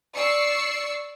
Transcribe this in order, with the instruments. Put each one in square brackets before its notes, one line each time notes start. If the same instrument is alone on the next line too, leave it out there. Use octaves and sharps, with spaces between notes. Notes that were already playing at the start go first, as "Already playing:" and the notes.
[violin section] D5 C#6 E6 C7 C#7